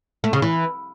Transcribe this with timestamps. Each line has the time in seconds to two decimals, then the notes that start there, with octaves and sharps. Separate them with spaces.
0.24 A3
0.33 C#3
0.42 E3